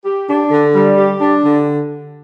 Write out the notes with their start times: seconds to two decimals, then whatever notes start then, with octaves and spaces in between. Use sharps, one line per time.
0.05 G4
0.28 D4
0.51 D3
0.74 G3
0.97 G4
1.21 D4
1.44 D3